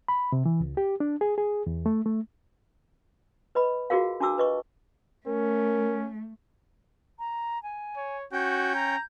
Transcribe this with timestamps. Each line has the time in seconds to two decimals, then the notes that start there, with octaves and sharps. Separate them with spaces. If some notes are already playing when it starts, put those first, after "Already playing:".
0.08 B5
0.32 C3
0.46 E3
0.61 C#2
0.77 G4
1.00 D4
1.21 G#4
1.38 G#4
1.67 E2
1.86 A3
2.06 A3
3.55 B4 D#5 B5
3.90 F4 F#4 G#4 A#4 F5
4.20 D4 F#4 A5 D6 E6
4.38 B4 D#5 C#6
5.26 A3 C#4 A#4
7.19 A#5
7.63 G#5
7.97 C#5
8.33 C#4 F#4 G5 G6
8.76 A#5